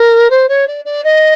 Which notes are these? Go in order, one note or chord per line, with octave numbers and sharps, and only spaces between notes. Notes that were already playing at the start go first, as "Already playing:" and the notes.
Already playing: A#4
C5
C#5
D5
D5
D#5